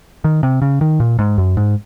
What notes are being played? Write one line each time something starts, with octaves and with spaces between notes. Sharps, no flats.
D#3
C3
C#3
D#3
A#2
G#2
F#2
G#2